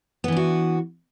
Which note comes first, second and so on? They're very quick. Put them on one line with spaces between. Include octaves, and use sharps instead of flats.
B3 E3 D4 F#4